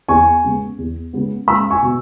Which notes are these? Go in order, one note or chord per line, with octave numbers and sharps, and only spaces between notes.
E2 G#5 C#6
C#3 G#3 B3
E2
C#3 G#3 B3
C#2 B5 E6
G#5 C#6
B2 B3